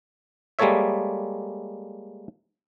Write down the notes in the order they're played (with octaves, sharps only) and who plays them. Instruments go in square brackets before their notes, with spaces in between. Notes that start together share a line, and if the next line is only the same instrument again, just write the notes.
[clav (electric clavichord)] G3 G#3 A#3 A4 C#5 E5